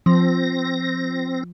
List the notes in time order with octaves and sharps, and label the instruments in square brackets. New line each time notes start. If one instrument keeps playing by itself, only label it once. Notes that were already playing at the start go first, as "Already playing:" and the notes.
[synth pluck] F3 [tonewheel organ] C4 A#6